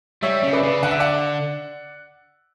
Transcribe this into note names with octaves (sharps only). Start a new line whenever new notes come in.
G3 C#5 E5
C#3 E5
B4 D5
C#3
D3 F#5
E5
D5 F#5